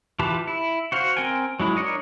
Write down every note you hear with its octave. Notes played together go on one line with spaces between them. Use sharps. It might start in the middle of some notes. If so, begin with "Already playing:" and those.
E3 F4 G4 B4 A5
E4
F#4 C5 F5
C4 A#4 G5 G#5
F#3 G#3 E4
D4 A#4 C#5 D#5